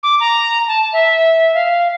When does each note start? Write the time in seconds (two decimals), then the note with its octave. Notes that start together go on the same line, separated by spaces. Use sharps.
0.03 D6
0.20 A#5
0.68 A5
0.93 E5
1.54 F5